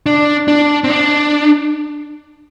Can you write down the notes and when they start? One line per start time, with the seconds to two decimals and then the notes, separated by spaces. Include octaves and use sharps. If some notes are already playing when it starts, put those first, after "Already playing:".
0.06 D4
0.48 D4
0.84 C4
0.90 D4